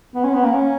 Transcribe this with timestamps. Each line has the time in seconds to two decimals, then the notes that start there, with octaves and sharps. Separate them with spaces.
0.15 B3
0.24 C#4
0.34 B3
0.44 A#3
0.54 C#4